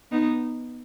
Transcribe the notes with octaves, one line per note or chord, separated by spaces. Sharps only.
B3 D#4